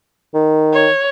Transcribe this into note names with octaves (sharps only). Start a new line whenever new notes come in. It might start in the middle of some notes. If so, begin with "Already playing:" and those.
D#3
C#5